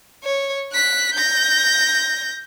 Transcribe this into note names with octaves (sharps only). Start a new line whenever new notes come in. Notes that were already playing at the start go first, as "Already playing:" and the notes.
C#5
F#6 B6
G6 A#6